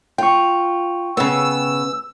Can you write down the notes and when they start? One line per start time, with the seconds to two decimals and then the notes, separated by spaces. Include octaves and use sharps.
0.18 F4 G5 C#6
1.17 C#3 B3 E6